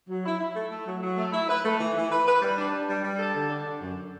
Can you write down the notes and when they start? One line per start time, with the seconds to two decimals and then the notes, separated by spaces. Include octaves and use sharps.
0.09 F#3
0.25 E4
0.40 E4
0.56 A3
0.72 A3
0.86 F#3
1.02 F#3
1.18 A3
1.33 E4
1.49 B4
1.65 A3
1.80 E3
1.96 E3
2.11 B4
2.27 B4
2.42 G3
2.57 D4
2.73 D4
2.89 G3
3.04 G3
3.19 A4
3.35 D3
3.50 D4
3.66 D3
3.81 F#2